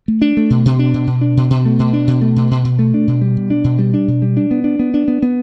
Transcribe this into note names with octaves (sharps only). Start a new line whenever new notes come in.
A3
D4
A3
B2
B2
D4
B2
B2
D4
B2
B2
A3
B2
D4
B2
A3
B2
B2
B2
A3
D4
B2
G3
B2
D4
B2
G3
D4
B2
G3
D4
B3
D4
B3
D4
B3
B3